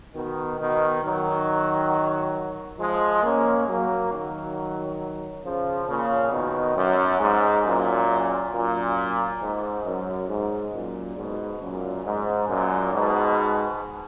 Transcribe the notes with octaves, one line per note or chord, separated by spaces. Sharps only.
B2 D#3
B2 D#3
D#3 F#3
F3 G#3
A#3 C#4
F#3 A#3
D#3 F#3
C#3 F3
A#2 C#3
B2 D#3
F#2
G#2
F#2 A#2
F#2 A#2
G#2
F#2
G#2
F#2 A#2
G#2 B2
F#2 A#2
G#2
F#2 A#2
G#2 B2